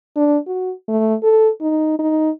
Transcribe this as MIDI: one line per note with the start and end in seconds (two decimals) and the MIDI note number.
0.16 0.37 62
0.47 0.72 66
0.88 1.14 57
1.23 1.49 69
1.61 1.95 63
1.98 2.30 63